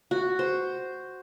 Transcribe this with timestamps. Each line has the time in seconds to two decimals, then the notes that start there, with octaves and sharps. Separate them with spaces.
0.11 F#4
0.39 C5